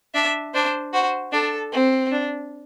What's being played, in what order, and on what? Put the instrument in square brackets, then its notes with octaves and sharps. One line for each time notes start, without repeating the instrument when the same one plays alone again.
[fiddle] D4 [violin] E5
[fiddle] D4 [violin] C5
[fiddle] F#4 [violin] C5
[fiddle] D4 [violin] A4
[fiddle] C4
[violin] D4